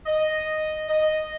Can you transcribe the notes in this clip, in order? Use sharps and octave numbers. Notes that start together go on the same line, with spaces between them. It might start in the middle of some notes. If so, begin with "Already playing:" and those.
D#5
D#5